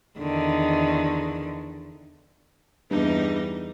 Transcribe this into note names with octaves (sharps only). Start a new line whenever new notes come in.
E2 D3 D#3
E2 G2 G3 D#4